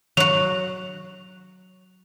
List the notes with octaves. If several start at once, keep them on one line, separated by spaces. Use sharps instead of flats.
F#3 F#4 F7